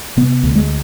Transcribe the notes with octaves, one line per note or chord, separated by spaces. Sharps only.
C3 B3
D2
G#3